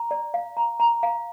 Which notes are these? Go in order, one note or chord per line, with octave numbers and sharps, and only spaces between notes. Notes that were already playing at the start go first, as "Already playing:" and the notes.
Already playing: A#5
D5
F5
A#5
A#5
F5